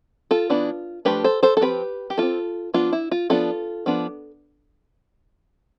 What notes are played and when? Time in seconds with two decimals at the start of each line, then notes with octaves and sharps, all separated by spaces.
0.31 F4 A4
0.50 E3 B3 D4
1.05 F3 A3 D4 G4 B4
1.24 A4 C5
1.43 A4 C5
1.57 A4
1.61 F3 C4 G4 B4
2.10 G4
2.18 G3 C4 F4 A4
2.74 F3 B3 D4 F4
2.92 E4
3.11 F4
3.30 F3 B3 D4 F4 A4
3.86 F3 B3 D4